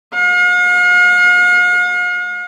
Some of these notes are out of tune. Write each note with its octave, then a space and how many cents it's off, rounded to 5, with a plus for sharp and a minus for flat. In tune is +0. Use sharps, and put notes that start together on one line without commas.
F5 +45